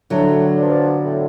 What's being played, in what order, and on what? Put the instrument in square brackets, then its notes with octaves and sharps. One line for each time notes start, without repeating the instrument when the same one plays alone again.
[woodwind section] A2 [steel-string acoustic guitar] D3 F#3
[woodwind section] F3 B3 D4
A2